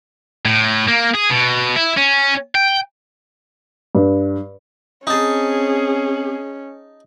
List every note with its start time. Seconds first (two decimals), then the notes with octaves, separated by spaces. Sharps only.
0.45 A2
0.88 A#3
1.15 G#4
1.30 B2
1.76 E4
1.97 C#4
2.55 G5
3.95 G2
5.07 C4 C#4 D#4 G#4 A5